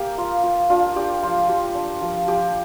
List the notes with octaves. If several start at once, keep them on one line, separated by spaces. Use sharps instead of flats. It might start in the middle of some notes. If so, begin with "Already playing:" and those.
Already playing: A#3 G4 A#4
F4
F4
D4 F4
D4 G4
F3 F4
F3 G4
D4
F3
F3 G4